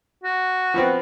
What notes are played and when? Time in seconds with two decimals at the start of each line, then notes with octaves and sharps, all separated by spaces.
0.24 F#4
0.74 F3 B3 C4